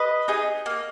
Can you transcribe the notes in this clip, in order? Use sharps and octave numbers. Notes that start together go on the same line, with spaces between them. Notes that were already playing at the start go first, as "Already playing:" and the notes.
Already playing: B4 D#5
D#4 G#4
A#3